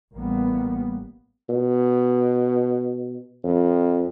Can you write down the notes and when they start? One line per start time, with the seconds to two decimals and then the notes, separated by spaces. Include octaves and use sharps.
0.13 A1 G3 A#3 B3
1.49 B2
3.44 F2